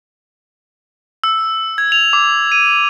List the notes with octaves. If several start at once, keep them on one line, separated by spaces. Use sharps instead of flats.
E6
G#6
F7
D6
D#7